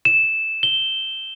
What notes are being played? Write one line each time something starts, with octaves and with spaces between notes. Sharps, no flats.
E7
G7